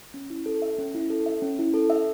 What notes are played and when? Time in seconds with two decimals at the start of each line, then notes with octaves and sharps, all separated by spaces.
0.14 C#4
0.30 E4
0.46 A4
0.62 E5
0.78 C#4
0.95 E4
1.10 A4
1.26 E5
1.42 C#4
1.59 E4
1.74 A4
1.90 E5